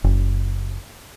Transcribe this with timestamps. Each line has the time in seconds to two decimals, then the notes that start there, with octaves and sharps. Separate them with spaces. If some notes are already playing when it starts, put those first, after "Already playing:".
0.04 F#1